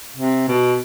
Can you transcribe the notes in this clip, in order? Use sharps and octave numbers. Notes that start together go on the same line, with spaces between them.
C3
B2